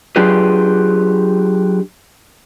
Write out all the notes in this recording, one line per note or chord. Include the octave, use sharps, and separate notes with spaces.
F#3 D4 F4 G4 G#4 B4